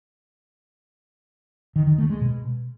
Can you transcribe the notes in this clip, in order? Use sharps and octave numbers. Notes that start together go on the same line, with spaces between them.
D#3
D#3
A3
G#3
B2